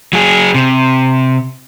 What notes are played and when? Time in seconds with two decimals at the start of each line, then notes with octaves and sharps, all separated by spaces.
0.13 F#3 G#4
0.55 C3